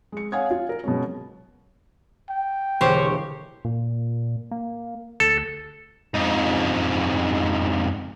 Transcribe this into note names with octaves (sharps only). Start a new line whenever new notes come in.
G#3 C#7
C#5 F5 F#5 G#5 D#6 G#6
F4
A#4
B2 F#3 G#3 C#4
G5
E1 D3 A#3 G4 C5 C#5
A#2
A#3
D2 A4
F2 G#2